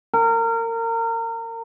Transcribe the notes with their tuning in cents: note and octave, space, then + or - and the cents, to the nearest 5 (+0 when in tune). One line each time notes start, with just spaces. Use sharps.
A#4 -30